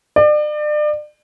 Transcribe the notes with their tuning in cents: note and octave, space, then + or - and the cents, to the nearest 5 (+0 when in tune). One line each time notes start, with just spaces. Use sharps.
D5 +35